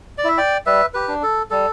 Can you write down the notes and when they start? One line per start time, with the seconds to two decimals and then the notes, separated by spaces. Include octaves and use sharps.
0.18 D5
0.24 E4 E5
0.38 D5 G5
0.66 G3 B4 E5
0.94 G4 B4
1.08 D4
1.23 A4
1.51 G3 A4